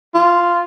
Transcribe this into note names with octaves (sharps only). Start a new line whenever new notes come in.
F4